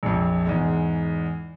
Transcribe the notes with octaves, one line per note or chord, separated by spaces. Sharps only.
A#1 F2
E2 G#2 G#3